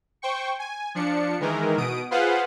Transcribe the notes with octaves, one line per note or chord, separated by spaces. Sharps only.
C5 G5 C#6
G#5
F3 D4 C#7
D#3 E3 G#3 A#4
B2 D#6 D7
F4 G#4 B4 C5 F5 F#5